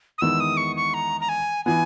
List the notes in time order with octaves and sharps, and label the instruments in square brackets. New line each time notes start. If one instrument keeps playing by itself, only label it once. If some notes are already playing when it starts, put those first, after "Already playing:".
[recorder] D#6
[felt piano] E2 D#3 G#3 B3 E4 [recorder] E6
[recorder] D#6
C#6
C#6
A#5
A#5
G#5
[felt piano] E3 B3 [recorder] G#5